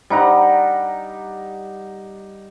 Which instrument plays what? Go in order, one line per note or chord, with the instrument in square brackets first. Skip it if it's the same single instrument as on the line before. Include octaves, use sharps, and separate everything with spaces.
[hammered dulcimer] G3 D#4 F#5 A#5